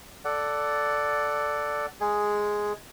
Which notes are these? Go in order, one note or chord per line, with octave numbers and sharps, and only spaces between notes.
A4 D5 F#5
G#3 G#4